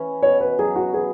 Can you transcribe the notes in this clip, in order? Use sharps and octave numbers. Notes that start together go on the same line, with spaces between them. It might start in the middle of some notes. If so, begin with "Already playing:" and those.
Already playing: E3 C#4
B2 C#5
B4
F#3 G#4
F#4
E3 G#4